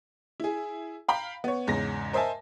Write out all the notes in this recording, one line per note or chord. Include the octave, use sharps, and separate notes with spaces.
E4 G#4
F5 G5 A#5 B5
B3 C#5
E2 G#2 C#3 A#6
A#4 C5 D#5 E5 G#5 A5